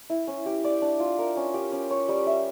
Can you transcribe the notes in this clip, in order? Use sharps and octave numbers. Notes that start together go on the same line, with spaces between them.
E4
C#4
G4
D5
D4
F4
A#4
C#4
G4
C#4
C#5
G3
E5